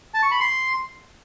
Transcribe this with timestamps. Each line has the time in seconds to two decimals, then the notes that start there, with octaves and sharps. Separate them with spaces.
0.14 A5
0.23 C#6
0.31 B5
0.40 C6